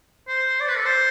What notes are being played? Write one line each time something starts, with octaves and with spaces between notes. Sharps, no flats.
C5
D5
B4
A4
C5